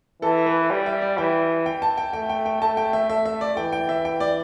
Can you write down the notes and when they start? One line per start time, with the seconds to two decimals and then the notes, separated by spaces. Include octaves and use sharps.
0.22 E3 A4
0.46 B4
0.70 G3 G5
0.86 E5
1.02 D5
1.17 E3 G5
1.66 G5
1.82 A5
1.98 G5
2.13 A3 G5
2.30 G5
2.46 G5
2.61 A3 A5
2.77 G5
2.93 E5
3.10 A3 E5
3.25 E5
3.41 D5
3.56 E3 G5
3.72 G5
3.89 E5
4.05 G5
4.20 D5